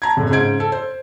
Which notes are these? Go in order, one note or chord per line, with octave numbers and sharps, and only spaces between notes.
A5 A#5 G#6
F#1 A2
G#2 C#3 C5 G#6 D7
A4
C5